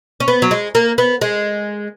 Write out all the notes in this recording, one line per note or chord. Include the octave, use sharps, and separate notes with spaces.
C#4
B3
F#3
G#3
A#3
B3
G#3